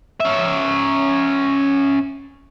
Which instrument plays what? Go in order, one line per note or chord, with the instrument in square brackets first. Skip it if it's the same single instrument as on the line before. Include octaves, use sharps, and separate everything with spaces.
[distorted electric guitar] C#4 E5